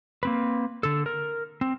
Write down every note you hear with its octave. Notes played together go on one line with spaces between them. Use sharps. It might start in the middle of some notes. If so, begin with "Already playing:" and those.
A#3 C4 B4
D3 A4
A#4
C4